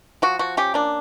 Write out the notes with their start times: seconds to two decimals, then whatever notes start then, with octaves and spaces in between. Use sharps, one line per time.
0.22 F3 F#4
0.39 F3 F#4
0.57 C#4 G4
0.74 A#3 D4